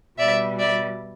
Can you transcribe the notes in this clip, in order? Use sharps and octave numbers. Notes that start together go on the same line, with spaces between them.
B2 G3 D5 E5
D5 E5